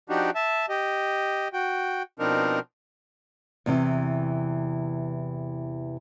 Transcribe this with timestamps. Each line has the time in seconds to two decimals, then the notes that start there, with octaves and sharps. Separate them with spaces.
0.09 F3 D4 D#4 F#4 G4
0.35 E5 A5
0.69 G4 D#5
1.53 F#4 G5
2.19 B2 F3 C4 D4 D#4 A#4
3.66 E2 C3 E3